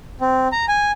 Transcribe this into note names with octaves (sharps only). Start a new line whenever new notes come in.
C4
A#5
G#5